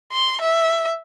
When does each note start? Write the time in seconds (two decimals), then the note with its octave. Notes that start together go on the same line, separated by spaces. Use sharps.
0.12 C6
0.41 E5